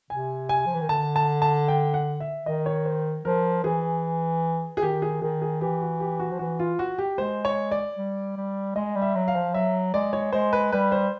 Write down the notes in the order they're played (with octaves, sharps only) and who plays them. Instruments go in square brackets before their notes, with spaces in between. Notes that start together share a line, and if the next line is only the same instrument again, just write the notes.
[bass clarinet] C3 [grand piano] G#5
[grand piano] G#5
[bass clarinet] F3
E3
D#3
[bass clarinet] D3 [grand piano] A5
[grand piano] A5
A5
G5
F#5
E5
[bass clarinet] D#3 [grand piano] D#5
[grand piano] C#5
C5
[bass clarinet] F3 [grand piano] A#4
[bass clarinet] E3 [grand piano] G#4
[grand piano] G#4
[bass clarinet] D#3 [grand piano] G4
[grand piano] G#4
[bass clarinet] D#3 [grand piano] G#4
[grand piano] G#4
[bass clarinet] E3 [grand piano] G4
[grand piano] F#4
G4
F#4
[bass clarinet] F3
[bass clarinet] E3 [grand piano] F#4
[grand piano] F4
F#4
G4
[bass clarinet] G#3 [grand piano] C5
[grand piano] C#5
D5
[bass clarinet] G3
G3
[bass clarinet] G#3 [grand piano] D#5
[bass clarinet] G3
[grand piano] E5
[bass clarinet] F#3
[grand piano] F5
[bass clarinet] F3
[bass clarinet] F#3 [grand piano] E5
[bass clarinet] G#3 [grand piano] D5
[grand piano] C#5
[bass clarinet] G#3 [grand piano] C5
[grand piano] B4
[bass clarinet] G3 [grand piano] B4
[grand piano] C5